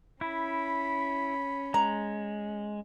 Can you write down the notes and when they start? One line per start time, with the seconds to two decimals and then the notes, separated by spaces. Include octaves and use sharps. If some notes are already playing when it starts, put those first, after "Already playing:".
0.21 C#4 E4 B5
1.74 G#3 A#5